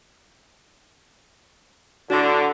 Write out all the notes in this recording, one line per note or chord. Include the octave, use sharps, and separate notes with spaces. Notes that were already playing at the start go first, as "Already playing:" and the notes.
A2 D3 D4 F#4